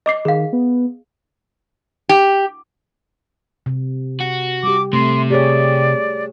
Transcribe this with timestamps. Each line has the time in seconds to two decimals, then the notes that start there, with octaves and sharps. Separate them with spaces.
0.06 D#5 D6 C7
0.25 D#3 G#4 F5
0.53 B3
2.09 G4
3.66 C3
4.21 F#4
4.63 G3 G4 D6
4.93 C3 A3 C6
5.30 G4 G#4 C#5 D5